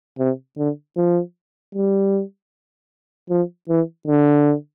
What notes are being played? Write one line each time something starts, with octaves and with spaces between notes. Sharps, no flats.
C3
D3
F3
G3
F3
E3
D3